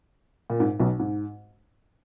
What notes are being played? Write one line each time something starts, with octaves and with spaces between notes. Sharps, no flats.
A#2
G#2
B1 B2
G#2